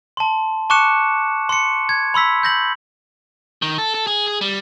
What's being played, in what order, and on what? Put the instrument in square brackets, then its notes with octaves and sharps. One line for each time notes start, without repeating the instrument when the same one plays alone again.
[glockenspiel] A5 C6
A5 C#6 D6 F#6 C#7 E7
C6 C#7
G#6
B5 C6 E6 B6
G6 A#6 F#7
[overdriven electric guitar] D#3
A4
A4
G#4
G#4
G3